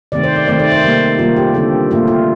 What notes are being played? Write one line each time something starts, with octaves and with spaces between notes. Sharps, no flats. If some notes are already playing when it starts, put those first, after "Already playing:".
C3 D#3 A3 C4 D5
C5
D5
D#3 A3 C4 D5
D5
C5
C3 G3 A#3
C3 D#3 G3 A#3 F4
G4
D3 G3 C4 A4
A#2 A3 C4 F4
F4